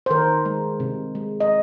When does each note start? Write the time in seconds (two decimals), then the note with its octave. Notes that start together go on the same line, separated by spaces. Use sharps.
0.06 C5
0.10 D#3 A#4
0.45 G#3
0.80 C3
1.15 G#3
1.40 D#5